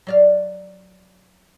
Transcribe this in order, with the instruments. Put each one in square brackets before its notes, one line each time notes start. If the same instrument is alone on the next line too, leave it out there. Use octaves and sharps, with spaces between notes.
[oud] F#3 D5 F5